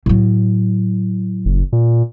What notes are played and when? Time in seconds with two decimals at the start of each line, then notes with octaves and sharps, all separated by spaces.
0.06 A2 F#3
1.45 F#1
1.73 A#2